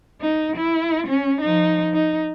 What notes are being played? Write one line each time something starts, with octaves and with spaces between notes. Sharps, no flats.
D#4
E4
C#4
F3 D#4
D#4